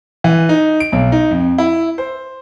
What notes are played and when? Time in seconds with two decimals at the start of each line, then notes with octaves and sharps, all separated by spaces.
0.24 E3
0.49 D#4
0.80 D7
0.92 B1
1.12 D#4
1.31 F2
1.58 E4
1.98 C5